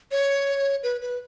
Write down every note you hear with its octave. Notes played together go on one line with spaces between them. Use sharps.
C#5
B4
B4